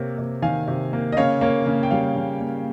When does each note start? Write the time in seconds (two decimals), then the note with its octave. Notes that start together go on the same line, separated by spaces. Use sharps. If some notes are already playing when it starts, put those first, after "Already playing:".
Already playing: C3 A#3 C#5
0.18 C3
0.42 D#3 F5 G#5
0.67 C3
0.93 A#3
1.12 D#5
1.17 C#3 C#5 F5
1.41 A#3 C#5
1.66 C#3
1.83 G5
1.91 G3 C#5 F5
2.16 C#3
2.41 A#3